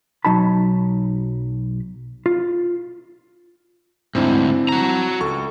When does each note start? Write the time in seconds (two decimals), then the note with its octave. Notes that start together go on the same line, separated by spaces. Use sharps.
0.25 B1 F#3 D#4 A5 B5
2.26 F4
4.15 D2 G#2 C4 D4 E4
4.69 F#4 A#5
5.21 C#2 A4 C#6